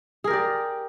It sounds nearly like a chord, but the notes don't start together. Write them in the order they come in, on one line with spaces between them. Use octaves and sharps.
G#4 A#4 G4 D5